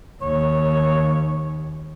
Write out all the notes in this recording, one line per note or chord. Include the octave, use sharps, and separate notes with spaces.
D#2 C#5